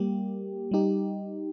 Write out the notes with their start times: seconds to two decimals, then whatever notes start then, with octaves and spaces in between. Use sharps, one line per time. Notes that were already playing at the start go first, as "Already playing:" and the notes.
Already playing: G3 A#3 G4
0.71 G3 D#4 G4